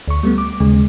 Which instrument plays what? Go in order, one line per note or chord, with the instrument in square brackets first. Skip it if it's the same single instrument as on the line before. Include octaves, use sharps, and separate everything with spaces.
[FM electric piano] D2 C#6
G3 A3 B3
D6
D#2 C#3 G#3